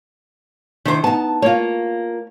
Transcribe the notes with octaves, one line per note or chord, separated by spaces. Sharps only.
D#3 E3 D4 C5
B3 D#4 A5
A#3 F4 C#5